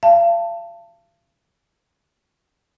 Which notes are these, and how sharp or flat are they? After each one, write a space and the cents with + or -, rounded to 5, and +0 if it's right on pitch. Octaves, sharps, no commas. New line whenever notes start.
F5 -40 A5 +15